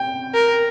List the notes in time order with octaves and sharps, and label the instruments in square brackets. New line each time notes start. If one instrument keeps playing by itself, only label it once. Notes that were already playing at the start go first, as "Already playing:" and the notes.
Already playing: [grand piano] G5
[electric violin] A#4